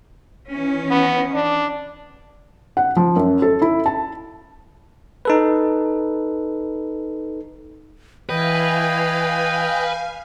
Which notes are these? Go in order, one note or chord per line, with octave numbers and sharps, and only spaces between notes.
D#3 E3 C#4
B3
D4
F#5
F3
F#2
A4
E4
A5
D#4 A4 B4
E3 B4 D#5 F5 G5 G#5